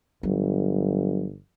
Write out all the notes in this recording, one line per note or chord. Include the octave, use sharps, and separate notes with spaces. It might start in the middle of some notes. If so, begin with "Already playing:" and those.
G1 F#3